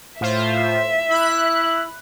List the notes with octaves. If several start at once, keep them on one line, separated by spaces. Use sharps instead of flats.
A2 F4 C5 E5
E4 B5 F#6